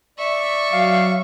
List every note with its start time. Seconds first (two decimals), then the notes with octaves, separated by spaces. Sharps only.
0.19 D5 E5 C#6
0.72 F#3 F5